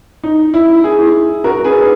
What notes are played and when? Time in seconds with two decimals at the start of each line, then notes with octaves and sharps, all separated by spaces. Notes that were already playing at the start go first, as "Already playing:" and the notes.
0.24 D#4
0.54 E4
0.84 E4 G#4
1.44 F#4 A#4
1.64 G#4 B4